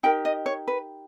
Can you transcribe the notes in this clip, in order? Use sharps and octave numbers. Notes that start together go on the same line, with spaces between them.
D#4 G4 A#4 G5
D#5
C#5
B4